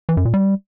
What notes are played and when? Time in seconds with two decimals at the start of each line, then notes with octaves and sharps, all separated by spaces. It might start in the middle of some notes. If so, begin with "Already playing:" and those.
0.09 E3
0.17 F#2
0.25 A#2
0.34 G3